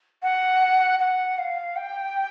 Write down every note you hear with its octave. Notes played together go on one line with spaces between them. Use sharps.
F#5
F#5
F5
G5